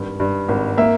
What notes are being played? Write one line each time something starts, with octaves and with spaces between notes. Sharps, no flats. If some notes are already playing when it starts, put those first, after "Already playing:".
Already playing: G#1 G2
G2
G#1
A#3 E5